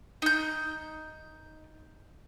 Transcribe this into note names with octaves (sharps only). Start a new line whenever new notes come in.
D#4 G6